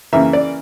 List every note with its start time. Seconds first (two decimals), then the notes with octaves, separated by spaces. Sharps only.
0.13 C#3 E3 A#3 E5
0.33 D5